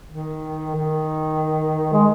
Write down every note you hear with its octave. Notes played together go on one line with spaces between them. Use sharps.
D#3
D#3
G#3